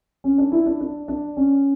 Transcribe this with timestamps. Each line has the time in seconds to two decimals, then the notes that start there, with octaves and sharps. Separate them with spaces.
0.24 C#4
0.38 D4
0.52 E4
0.66 D4
0.81 D4
1.08 D4
1.37 C#4